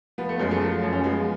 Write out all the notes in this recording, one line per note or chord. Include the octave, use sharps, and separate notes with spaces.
F3 B3
A3
F#2 G#3
F#3 A3
F3
F#2
C#4
F3 G#3 B3